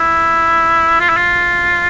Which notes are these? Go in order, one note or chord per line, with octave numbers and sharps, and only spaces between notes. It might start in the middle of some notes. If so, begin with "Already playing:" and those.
Already playing: E4
F4
E4
F4